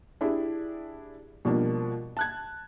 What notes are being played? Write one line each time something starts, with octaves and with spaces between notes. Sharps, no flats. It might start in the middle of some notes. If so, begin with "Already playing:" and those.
D4 E4 G4 G#4
B2 F3 G3 A#3 D4
A5 F#6 G#6